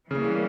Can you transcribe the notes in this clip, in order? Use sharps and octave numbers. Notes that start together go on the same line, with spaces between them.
C#3 E3 G3 A#3